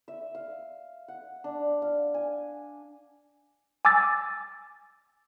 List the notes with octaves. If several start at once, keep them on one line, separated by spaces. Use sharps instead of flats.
E5
F5
F#5
D4
F5
G#5
G#5 D6 E6 A6